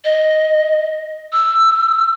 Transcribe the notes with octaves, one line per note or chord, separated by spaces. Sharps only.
D#5
E6